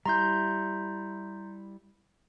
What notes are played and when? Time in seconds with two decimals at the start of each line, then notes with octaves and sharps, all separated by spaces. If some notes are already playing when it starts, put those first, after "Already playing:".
0.06 G3 E4 A#5 C6 G6